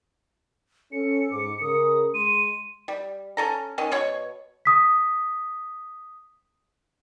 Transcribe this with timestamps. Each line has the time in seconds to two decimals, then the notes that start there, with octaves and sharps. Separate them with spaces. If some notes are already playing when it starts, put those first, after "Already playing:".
0.92 C#4 A4 C#7
1.31 G#2 D6
1.61 C#3 A#4 D#6
2.14 G#3 C6 D#7
2.88 G3
3.37 C#4 A4 A#5
3.78 D#3 C#4
3.92 B2 C#5 C#6
4.65 D#6 B6